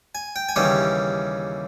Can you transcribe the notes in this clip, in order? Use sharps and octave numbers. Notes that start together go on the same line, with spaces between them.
G#5
G5
G#5
D#2 C#3 E3 G3 C#4 G5